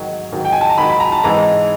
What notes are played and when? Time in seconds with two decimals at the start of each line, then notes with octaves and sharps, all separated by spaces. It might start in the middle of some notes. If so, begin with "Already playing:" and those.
Already playing: G#2 D#3 F#3
0.32 G#2 D#3 F#3
0.45 G5
0.52 G#5
0.61 A5
0.69 A#5
0.78 G#2 D#3 F#3 B5
0.89 B5
1.00 A#5
1.12 A5
1.24 G#2 E3 G#3 A#5